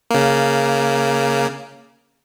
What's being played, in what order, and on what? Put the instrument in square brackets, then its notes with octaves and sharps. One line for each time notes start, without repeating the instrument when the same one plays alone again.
[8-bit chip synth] C#3 A#3